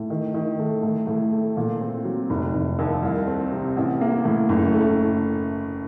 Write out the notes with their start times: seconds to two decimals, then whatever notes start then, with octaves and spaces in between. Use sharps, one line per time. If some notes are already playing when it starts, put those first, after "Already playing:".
Already playing: A2
0.10 D#3
0.34 D#3
0.59 A3
0.83 A2
1.07 A2
1.31 A3
1.57 A#2
1.81 C4
2.05 F#3
2.30 F1
2.54 F1
2.79 D#2
3.03 C2
3.27 C4
3.52 C3
3.76 A1
4.01 A#3
4.25 A2
4.49 F#1
4.74 A3